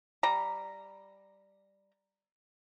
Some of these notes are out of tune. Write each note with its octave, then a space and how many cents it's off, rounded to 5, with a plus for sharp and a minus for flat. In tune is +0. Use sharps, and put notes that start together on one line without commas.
G3 +0 A#5 +0